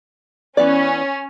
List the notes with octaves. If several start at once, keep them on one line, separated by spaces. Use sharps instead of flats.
E3 B3 C#4 D5